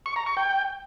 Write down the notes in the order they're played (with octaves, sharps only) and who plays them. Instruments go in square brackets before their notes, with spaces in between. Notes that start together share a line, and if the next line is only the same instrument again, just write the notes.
[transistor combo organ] C#6
A#5
C#6
G5